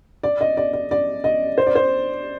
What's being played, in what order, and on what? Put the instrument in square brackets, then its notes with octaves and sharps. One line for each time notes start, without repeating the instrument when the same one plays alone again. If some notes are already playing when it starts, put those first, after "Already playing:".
[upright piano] D5
D#5
D5
D5
D5
D#5
C5
D5
C5